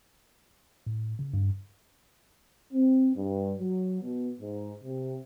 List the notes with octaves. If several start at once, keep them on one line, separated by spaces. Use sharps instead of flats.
A2
C#3
G2
C4
G2
F#3
B2
G#2
C3